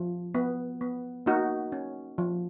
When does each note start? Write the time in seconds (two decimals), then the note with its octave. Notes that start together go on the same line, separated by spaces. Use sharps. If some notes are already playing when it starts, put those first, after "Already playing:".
Already playing: F3
0.35 B3
0.81 B3
1.26 A#3 D#4 F#4
1.72 C#4
2.18 F3